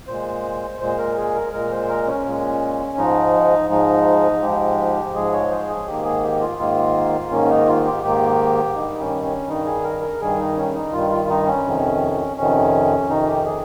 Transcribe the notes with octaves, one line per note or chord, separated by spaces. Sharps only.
A#2 G#3 C5
A#2 G#3 C5
A#4
G#4
A#4
A#2 G#3 A#4
C5
A#4
C#4
A#2 G#3
G#2 F3 G#3 D#4
G#2 F3 G#3 D#4
G#2 F3 G#3 G4
G#2 F3 G#3 G#4
C#5
C5
G#4
G#2 D#3 A#3 G4
G#4
G4
F4
G#2 D#3 A#3 F4
G#2 D#3 A#3 C#4
D#4
F4
G4
G#2 D#3 A#3 G4
G2 D#3 G3 D#4
C#4
C#4
G2 D#3 G3 D#4
G#4
A#4
A#4
G2 D#3 G3 G#4
D#4
C#4
D#4
G2 D#3 G3 F4
F4
D#4
C#4
F2 C3 D#3
F2 C3 D#3 C#4
F2 C3 D#3 D#4
G4
G#4